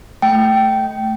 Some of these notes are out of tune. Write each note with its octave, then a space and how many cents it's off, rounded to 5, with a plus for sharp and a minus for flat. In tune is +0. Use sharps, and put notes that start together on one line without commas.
A3 +0 G5 -15